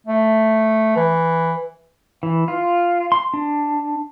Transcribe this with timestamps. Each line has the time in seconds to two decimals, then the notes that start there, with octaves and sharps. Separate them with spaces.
0.06 A3
0.96 E3
2.23 E3
2.48 F4
3.12 C6
3.34 D4